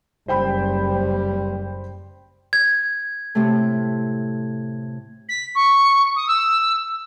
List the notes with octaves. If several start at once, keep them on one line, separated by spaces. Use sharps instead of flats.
F#1 G3 C5 G5 B5
G#6
A2 C3 A3
B6
C#6
D#6
E6